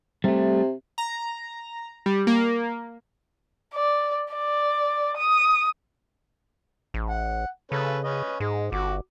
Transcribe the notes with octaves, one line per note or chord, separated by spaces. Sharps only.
C3 G3 A3
A#5
G3
A#3
D5
D5
D#6
A1
F#5
C#3 C#4 A4 B4
C#4 B4 D#5
G#2 G#3
G1 F#4 D6